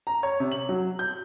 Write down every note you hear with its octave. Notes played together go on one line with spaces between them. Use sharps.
A#5
C#5
C3
F#7
F#3
G6